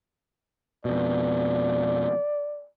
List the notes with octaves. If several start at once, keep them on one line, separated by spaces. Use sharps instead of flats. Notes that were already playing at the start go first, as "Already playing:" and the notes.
F2 B2 D5